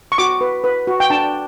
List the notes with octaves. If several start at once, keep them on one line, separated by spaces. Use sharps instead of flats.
C#6
F#4 D6
B4
B4
F#4
G5
D4 A5